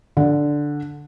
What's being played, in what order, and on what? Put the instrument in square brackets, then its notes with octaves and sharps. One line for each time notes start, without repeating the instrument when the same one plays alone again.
[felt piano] D3